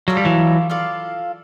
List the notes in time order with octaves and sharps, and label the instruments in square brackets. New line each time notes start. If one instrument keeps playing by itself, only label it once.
[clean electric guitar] F#3 [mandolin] F4 A4 D5 F5
[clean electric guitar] G3
E3 F#3
[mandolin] F4 A4 D5 F5